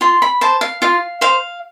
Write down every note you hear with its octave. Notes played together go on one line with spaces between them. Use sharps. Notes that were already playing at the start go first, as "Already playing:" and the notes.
F4 C6
B5
C5 A5
F5
F4 F5
C5 F5